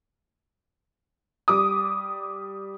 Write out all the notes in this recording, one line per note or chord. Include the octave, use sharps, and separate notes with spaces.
G3 D6 D#6